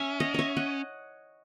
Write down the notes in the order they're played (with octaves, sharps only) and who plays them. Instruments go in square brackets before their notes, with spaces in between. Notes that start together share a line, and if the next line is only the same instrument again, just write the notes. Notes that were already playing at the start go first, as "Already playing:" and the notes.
Already playing: [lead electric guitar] C#4 [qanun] E5 G#5
[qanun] D#5 F#5
C#5 D#5 E5
D#5 F#5